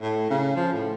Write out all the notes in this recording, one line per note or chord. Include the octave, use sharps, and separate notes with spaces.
A2
C#3
F3
A2